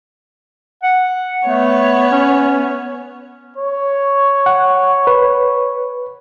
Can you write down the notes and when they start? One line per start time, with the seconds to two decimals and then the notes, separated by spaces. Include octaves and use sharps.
0.83 F#5
1.47 A3 B3 C#5
2.12 C#4
3.56 C#5
4.46 F#5
5.07 B4